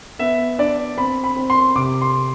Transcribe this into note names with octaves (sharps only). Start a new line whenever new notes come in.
B3 E5
D4 D5
C4 B5
B5
C4
C6
C3 D6
C6